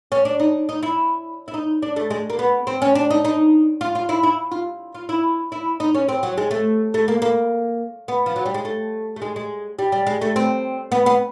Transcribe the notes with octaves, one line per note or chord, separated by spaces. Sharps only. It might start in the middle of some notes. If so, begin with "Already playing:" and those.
C#4
D4
D#4
D#4
E4
E4
D#4
D4
A3
G#3
A#3
B3
C4
C#4
D4
D#4
D#4
F4
F4
E4
E4
F4
F4
E4
E4
D#4
C#4
C4
F#3
G#3
A3
A3
A#3
A#3
B3
F3
F#3
G3
G#3
A3
A3
G#3
G#3
G3
G3
G#3
A3
C4
B3
B3